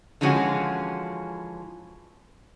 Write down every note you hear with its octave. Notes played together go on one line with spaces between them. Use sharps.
D3 E3 F3 G#3 C#4 F#4